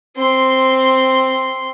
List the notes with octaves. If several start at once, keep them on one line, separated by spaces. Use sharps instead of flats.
C4 C6